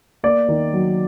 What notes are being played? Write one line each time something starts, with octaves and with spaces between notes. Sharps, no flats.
A#3 D5
D#3
F#3